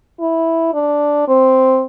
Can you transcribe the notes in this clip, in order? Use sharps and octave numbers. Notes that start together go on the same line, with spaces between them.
E4
D4
C4